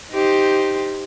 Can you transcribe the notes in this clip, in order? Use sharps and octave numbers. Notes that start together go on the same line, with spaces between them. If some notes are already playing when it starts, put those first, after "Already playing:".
D#4 G4 C5